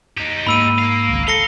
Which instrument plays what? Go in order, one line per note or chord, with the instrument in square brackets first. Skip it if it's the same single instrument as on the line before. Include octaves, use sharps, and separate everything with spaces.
[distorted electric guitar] D#4 G4
[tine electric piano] G#2 A#3 [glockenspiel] B5 E6 D#7
[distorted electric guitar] A#4 F5
[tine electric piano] G#1 C#2
[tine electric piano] A4 [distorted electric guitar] F5 [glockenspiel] A#6 C#7 G7